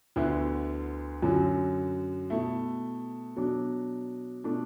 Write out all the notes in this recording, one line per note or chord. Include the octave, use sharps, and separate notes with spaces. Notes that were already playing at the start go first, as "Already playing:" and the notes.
D2 D3 B3 E4
F#2 D3 F#3
B2 A3 E4
B2 F#3 D4
B2 A3 D4